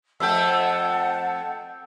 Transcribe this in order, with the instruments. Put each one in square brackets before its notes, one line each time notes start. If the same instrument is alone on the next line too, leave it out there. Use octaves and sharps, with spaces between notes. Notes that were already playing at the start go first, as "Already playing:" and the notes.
[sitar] F2 A3 A4 [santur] E5 G5 [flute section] F#5 A5